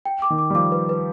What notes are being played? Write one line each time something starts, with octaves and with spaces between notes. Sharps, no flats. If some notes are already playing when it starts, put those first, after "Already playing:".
G5
D6
D#3
D6
G3
F3 D6
B4
B4